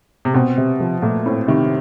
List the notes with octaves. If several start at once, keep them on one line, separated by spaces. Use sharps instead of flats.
C3
B2 C4
C3
F3
A#2 A3
A2 C4
C3 D#3